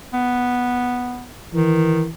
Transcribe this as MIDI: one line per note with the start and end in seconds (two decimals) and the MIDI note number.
0.13 1.27 59
1.54 2.05 51
1.54 2.08 52